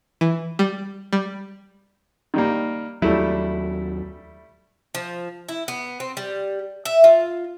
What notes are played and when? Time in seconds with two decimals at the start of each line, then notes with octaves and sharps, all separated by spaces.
0.21 E3
0.59 G3
1.13 G3
2.34 D#3 G3 A#3
3.02 D#2 F#3 G3 A3 E4
4.95 F3
5.49 E4
5.68 B3
6.00 C4
6.17 G3
6.85 E5
7.04 F4